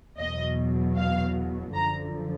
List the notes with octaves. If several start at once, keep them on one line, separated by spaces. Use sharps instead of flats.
E2 B2 F#3 D#5
F5
F#2 D3 F3 A#5